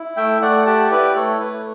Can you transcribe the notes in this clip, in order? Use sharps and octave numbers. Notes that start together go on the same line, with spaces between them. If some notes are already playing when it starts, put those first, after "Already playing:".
Already playing: E4
A3 E5 G5
A3 D5 F#5
G4 F#5 A5
E4 B4 D5
A3 A4 C#5
A3 B4